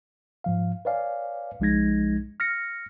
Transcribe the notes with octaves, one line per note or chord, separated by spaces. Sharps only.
G#2 F3 F5
B4 C#5 D5 F5 G#5
B1 F3 G#3 D#4 G#6 A#6
F6 A#6 C#7